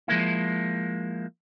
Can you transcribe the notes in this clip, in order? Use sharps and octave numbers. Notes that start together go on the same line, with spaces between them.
F3 G#3 A#3 E4